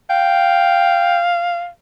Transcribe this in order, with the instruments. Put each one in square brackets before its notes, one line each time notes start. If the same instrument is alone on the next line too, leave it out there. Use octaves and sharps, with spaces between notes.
[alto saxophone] F5 [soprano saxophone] G5